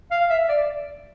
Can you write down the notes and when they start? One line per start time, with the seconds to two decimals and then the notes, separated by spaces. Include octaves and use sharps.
0.11 F5
0.30 E5
0.49 D5